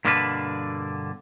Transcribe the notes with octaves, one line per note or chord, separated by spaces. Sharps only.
G2 B2 D3 A#3 D4 B4